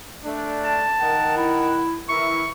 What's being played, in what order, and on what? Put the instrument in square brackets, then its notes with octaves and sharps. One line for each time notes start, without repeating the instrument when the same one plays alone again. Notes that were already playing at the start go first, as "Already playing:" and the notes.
[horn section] A3 D4
[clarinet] A5
[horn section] D#3 A#4 F#5
[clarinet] E4
[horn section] E3 E4 A#4 [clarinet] C#6